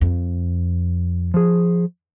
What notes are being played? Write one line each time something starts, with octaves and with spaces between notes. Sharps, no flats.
F2
F3 G#4